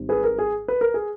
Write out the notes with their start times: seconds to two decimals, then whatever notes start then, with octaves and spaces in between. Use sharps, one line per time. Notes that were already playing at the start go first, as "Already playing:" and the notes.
Already playing: G#1 G#2 G3
0.09 G#4 B4
0.24 A#4
0.38 G#4
0.68 B4
0.81 A#4
0.94 G#4